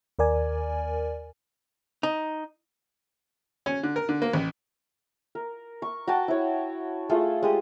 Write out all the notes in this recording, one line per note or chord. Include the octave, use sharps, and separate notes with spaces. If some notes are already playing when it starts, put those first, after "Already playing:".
D#2 A#4 D5 G#5
D#4
C#4
D3
A#4
D3
A#3
A1
A#4
C#6
F#4 F#5 G5 A5
E4 C#5
A3 F4 G#4 A4
G#3 G4 D#6